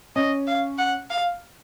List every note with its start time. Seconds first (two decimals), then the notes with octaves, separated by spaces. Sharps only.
0.16 C#4 D#5
0.47 F5
0.79 F#5
1.10 F5